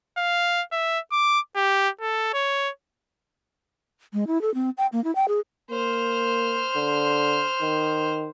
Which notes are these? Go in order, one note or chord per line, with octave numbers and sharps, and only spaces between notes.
F5
E5
D6
G4
A4
C#5
G#3
E4
A4
C4
G5
A#3
E4
G5
G#4
A#3 C5 F6
D3
D#3